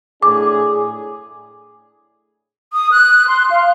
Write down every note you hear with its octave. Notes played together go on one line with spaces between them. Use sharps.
A2 D4 G#4 D6
D#6
F#6
C6
F5